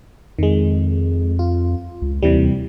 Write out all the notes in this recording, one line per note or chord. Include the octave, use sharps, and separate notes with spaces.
F2 D#3 G#3
F4
C#2
D#2 C3 E3 G3